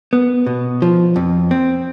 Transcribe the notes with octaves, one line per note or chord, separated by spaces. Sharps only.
B3
B2
F3
F2
C4